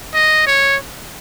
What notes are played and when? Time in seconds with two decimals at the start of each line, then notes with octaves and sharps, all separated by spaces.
0.14 D#5
0.47 C#5